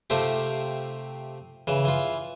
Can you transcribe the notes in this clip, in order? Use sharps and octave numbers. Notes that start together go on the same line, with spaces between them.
C3 A3 C4 F4 G4
C#3 E3
E3 F4